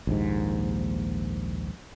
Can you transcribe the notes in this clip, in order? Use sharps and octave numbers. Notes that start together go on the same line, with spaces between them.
A#1 D#2 G#2